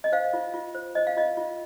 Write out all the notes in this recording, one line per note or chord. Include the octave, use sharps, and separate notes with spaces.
D#5
C5 F5
F4
F4
C5
C5 D#5
F5
F4 D#5
F4